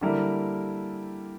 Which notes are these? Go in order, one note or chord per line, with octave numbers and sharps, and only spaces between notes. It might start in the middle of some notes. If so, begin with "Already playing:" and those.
D3 G3 A#3 E4 A#4